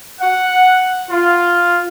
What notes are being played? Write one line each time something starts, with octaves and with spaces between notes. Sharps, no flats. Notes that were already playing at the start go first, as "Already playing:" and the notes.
F#5
F4